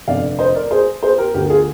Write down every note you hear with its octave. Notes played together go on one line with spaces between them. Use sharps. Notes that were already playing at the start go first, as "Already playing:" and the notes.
F1 F2 D3 D5 F5
C5 D#5
A#4 D5
G#4 C5
G#4 C5
G4 A#4
D2 D3 G4 A#4
F4 G#4